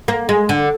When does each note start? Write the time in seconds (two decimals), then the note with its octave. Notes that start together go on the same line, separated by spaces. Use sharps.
0.08 A#3
0.29 G#3
0.49 D3